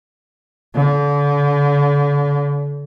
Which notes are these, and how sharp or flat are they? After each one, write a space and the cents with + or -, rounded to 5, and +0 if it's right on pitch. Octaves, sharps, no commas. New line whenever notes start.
D3 -35